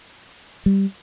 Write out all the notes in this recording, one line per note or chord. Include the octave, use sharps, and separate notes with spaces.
G3